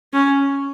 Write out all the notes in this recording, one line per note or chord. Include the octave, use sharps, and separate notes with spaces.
C#4